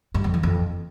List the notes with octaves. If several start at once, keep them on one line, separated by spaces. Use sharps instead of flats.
G2
F2
E3
F2